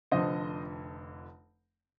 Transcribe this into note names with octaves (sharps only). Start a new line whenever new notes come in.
F1 F2 D3 C5 D#5